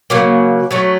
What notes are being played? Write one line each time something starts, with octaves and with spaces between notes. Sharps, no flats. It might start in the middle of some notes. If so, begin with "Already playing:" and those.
C#3 F#3 A#3
F#3 A3 C#4